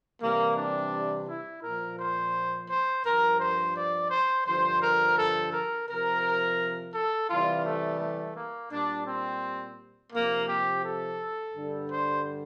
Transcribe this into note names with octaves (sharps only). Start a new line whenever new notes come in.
C3 E3 G3 A#3
D4
E4
A#2 F3 A#4
C5
C5
G2 F3 A#4
C5
D5
C5
G2 D3 F3 C5
A#4
A4
A#4
C3 F3 A#4
A4
C3 E3 G3 F4
A3
A3
A#3
A#2 G3 D4
C4
C3 F3 A#3
G4
A4
G2 D3 G3
C5